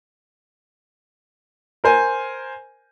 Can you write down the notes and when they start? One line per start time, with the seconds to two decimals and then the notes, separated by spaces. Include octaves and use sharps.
1.84 A#4 C5 G#5